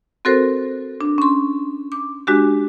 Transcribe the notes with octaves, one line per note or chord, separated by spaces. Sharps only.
C4 F#4 A4 A#4 C5
D4
C#4 C6
D6
G#3 D4 F#4 G4